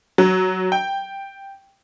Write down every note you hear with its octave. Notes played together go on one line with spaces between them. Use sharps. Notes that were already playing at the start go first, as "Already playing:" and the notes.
F#3
G5